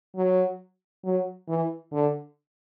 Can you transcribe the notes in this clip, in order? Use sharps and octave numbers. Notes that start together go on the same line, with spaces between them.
F#3
F#3
E3
D3